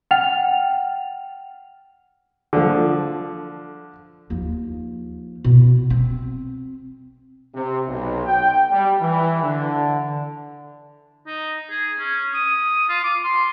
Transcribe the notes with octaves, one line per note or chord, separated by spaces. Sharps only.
F#5 G5 F6 A6 F7
D3 F3
D#2 F3
B2
C4
C3
B1
G5
G3
E3
D3
D#4
G#4
C#4
D#6
F4
D6
C6